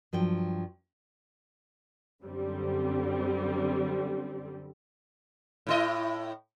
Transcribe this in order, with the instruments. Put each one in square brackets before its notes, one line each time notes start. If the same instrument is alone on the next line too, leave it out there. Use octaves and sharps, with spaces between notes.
[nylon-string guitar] G2 F3 F#3 G5
[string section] F#2 D3 G3 C4
[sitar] A2 E4 D#5